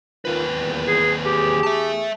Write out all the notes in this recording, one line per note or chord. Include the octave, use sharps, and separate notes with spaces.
D#2 D#4 F4 A#4 B4
E2 A#2
G#4
E2 G4 G#4
E5 A5